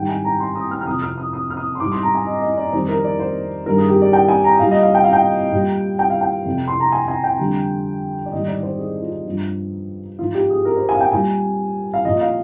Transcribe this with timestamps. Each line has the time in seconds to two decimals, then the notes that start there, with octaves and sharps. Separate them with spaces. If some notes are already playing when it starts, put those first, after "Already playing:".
Already playing: G#2 D#3 G3 G5
0.09 G#5
0.24 A#5
0.40 C6
0.55 D#6
0.71 F6
0.81 F6
0.87 F2 C3 F3 D#6
1.02 F6
1.18 D#6
1.33 D#6
1.50 F6
1.57 D#6
1.75 C6
1.80 G#2 G3 D6
1.92 C6
2.03 A#5
2.15 G#5
2.26 D#5
2.42 D#5
2.57 D5
2.73 F2 D#3 G3 C5
2.88 A#4
3.04 D5
3.19 C5
3.66 G2 D#3 G3 A#4
3.78 G#4
3.90 G4
4.01 D5
4.13 G5
4.28 G#5
4.44 A#5
4.60 A#2 G3 F5
4.71 D#5
4.83 F5
4.95 G5
5.04 F5
5.13 G5
5.53 A#2 G3
5.99 G5
6.10 F5
6.21 G5
6.46 F2 C3 F3
6.68 C6
6.80 A#5
6.92 G#5
7.08 G#5
7.24 G5
7.39 F2 D3 G3
8.26 D5
8.32 G#2 D#3 G3 D#5
8.48 D5
8.63 C5
8.79 G#4
9.02 F4
9.26 G2 F3
10.19 G#2 F3 F4
10.34 G4
10.50 G#4
10.65 A#4
10.77 C5
10.89 G#5
10.95 F5
11.01 G5
11.12 A#2 G3 G#5
11.94 F5
12.05 A#2 F3 D#5
12.21 F5